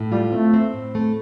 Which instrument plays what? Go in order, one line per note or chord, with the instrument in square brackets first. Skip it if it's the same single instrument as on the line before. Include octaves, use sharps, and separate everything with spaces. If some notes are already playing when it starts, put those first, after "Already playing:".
Already playing: [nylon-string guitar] A2
[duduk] G3 [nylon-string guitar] F4
[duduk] A3 [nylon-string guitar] C4
[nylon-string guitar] C4
A2
A3